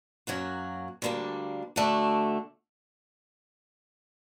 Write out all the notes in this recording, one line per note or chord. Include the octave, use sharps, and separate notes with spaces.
F#2 F#3 A#3 F#4
D2 D3 G3 A#3 D4
D3 A3 D4 F#4